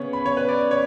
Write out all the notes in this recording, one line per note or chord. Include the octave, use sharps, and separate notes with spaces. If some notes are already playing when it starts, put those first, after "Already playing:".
Already playing: C#3 B3 C#5
B5
C#5
B4
D5
C#5